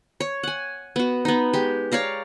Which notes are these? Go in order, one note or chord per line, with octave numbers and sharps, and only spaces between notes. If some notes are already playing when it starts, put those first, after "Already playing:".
C#5
F#5 G#5
B3 F#4
B3 D#4
G#3 G4
C#5 D5 F5 A#5